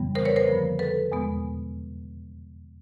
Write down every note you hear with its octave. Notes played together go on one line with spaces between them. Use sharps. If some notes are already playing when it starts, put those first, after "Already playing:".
Already playing: F2 C#3 E3 G3 B3
A#4 C5
B4 C#5
A#4 C5
G2 D3 F3 A#3
A4 B4
E2 B2 G#3 B3